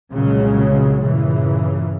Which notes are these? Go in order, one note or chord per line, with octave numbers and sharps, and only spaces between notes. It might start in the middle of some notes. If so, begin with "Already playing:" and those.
C2 A#2 C#3 F#3 G#3 C#4
G2 A#2 C#3 E3